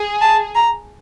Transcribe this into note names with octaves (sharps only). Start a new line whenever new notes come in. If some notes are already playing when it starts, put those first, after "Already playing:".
Already playing: G#4
A5
A#5